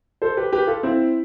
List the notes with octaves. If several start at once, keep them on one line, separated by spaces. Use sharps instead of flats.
A4 C5
G4 B4
G4 B4
F4 A4
C4 E4